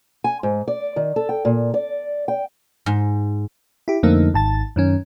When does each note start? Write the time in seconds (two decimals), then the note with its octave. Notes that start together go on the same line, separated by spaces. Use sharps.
0.24 G#5
0.43 G#2
0.68 D5
0.96 D#3
1.16 A4
1.29 G5
1.45 A#2
1.74 D5
2.28 G5
2.86 G#2
3.88 E4 G4
4.03 F2 D3 A3 A#3 D#4
4.34 G#1 A5 A6
4.76 F#2 D#3 C#4